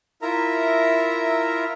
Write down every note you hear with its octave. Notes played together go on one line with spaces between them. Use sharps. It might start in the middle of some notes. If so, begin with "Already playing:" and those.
E4 F4 A#4 E5 A#5